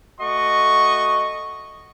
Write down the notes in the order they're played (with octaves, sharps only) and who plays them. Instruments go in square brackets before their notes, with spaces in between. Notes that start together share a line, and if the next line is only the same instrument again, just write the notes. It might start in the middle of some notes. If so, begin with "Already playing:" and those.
[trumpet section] A3 F#4 D#5 C#6